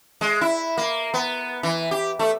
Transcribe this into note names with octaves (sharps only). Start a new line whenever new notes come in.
G#3
E4
A#3
B3
E3
G4
A3